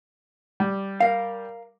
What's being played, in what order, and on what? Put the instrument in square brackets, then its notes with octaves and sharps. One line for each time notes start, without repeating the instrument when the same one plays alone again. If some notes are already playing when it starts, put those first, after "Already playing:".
[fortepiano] G3
[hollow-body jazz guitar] A#4 F5